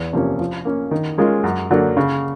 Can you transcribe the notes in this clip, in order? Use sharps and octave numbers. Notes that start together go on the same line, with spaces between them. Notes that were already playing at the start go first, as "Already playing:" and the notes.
Already playing: E2
C3 F3 A#3 C#4
F3
A#3 C#4
D#3
G#3 C#4 F4 A#4
F#2
D3 F#3 A#3
C#3